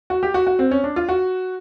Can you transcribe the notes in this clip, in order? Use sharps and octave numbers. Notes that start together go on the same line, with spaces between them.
F#4
G4
F#4
F#4
C4
C#4
D4
F4
F#4